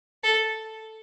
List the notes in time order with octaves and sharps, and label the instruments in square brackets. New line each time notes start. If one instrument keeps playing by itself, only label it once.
[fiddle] A4